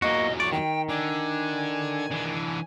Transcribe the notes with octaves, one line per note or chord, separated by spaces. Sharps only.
E2 F#3 A#3 F#4 D#5
D5 C#6
D#3 G5
D3 G#5
E3 D4